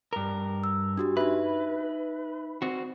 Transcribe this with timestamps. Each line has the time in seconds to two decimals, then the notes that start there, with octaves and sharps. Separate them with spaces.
0.13 G2 A#4
0.64 E6
0.97 D4 F#4 G4
1.17 D#4 B4 E5
2.62 C4 F#4